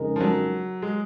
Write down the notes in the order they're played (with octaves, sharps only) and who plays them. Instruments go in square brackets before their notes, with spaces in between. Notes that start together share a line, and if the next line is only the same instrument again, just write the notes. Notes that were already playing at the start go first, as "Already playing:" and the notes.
Already playing: [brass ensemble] F2 C#3 G#3 D#4 A#4
[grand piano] F3
F#3
G#3